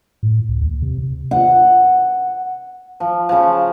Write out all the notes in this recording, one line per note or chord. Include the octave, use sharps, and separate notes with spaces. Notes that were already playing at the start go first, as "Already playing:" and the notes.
A2
C#2
D#2
C3
F#5
F3
C#3 F3